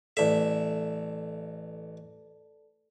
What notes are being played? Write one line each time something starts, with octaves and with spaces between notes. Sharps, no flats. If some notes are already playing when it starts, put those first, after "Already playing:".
A1 A4 D5 E5 A5